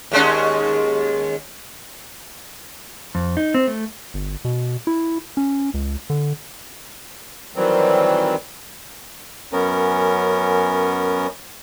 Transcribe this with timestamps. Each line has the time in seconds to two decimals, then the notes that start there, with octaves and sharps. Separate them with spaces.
0.11 D#2 G#3 C#4
3.15 F2
3.37 D#4
3.54 C4
3.67 A3
4.14 G1
4.45 B2
4.87 E4
5.37 C#4
5.74 C#2
6.10 D3
7.56 D#3 E3 F#3 G3 C4
9.52 F#2 B3 C#4 A#4